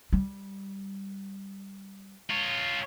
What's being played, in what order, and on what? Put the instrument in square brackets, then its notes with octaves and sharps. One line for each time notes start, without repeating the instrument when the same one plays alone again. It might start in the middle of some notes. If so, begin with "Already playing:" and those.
[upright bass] G3
[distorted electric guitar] F4 C#5